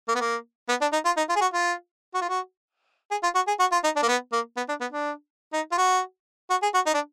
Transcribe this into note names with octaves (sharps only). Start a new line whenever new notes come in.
A#3
B3
A#3
B3
D4
D#4
F4
D#4
F4
G#4
F#4
F4
F#4
F4
F#4
G#4
F4
F#4
G#4
F#4
F4
D#4
D4
A#3
B3
A#3
B3
D4
B3
D4
D#4
F4
F#4
F#4
G#4
F#4
D#4
D4